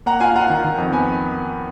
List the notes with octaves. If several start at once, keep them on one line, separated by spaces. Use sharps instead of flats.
A#3 F#5 A#5
F4 F5 G#5
F4 F#5 A#5
D#3
D#3
F2
B3 G#5 B5